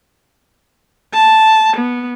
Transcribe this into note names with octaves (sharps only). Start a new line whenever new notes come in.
A5
B3